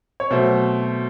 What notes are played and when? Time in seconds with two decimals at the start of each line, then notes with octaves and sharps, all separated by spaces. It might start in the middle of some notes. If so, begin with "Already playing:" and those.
0.20 C#5
0.31 B2 F#3 A3 C5